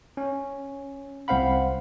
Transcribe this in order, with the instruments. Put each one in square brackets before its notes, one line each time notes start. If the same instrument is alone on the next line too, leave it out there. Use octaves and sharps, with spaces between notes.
[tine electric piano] C#4
C2 C4 C5 F5 F#5 B5